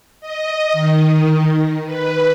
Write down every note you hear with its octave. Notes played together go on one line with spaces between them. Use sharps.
D#5
D#3
B4